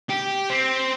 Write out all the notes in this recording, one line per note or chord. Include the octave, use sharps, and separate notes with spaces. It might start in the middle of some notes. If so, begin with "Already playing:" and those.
G4
C4